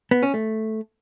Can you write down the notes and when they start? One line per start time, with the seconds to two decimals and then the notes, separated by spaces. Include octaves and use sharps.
0.11 B3
0.23 C#4
0.34 A3